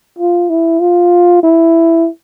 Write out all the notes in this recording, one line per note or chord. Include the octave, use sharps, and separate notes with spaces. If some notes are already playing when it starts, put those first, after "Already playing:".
F4
E4
F4
E4